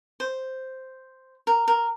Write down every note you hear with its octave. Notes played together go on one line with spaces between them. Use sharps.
C5
A#4
A#4